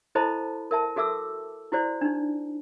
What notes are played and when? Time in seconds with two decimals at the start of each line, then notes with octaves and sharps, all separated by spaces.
0.15 E4 A4 C5 D#5 A5 B5
0.71 A#4 E5 A5
0.96 F#4 A4 E5 D6 E6
1.72 E4 F#4 C5 D5
2.01 D4 D#4